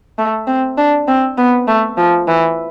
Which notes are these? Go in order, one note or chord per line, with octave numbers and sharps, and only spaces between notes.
A3
C4
D4
C4
B3
A3
F3
E3